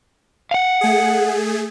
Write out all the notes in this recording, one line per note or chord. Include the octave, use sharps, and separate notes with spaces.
F5 F#5
A3 G#4